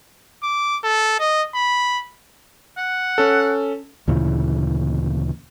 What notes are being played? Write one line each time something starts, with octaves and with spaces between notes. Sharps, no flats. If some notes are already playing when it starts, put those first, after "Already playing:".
D6
A4
D#5
B5
F#5
C#4 A4
D2 A#2 C#3 E3